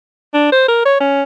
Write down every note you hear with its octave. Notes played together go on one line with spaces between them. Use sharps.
D4
C5
A#4
C#5
C#4